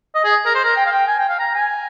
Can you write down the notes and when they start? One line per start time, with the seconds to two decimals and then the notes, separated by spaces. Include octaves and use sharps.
0.15 D#5
0.24 G#4
0.45 A#4
0.55 C5
0.64 A#4
0.76 G5
0.85 F5
0.92 G5
1.07 G#5
1.18 G5
1.28 F5
1.39 A#5
1.54 G#5